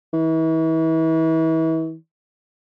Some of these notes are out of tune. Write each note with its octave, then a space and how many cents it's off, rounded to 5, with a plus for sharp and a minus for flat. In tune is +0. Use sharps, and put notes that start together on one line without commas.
E3 -35